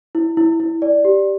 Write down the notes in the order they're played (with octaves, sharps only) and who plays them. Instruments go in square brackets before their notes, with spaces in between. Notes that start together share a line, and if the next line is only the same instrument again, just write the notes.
[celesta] E4
E4
E4
D5
G4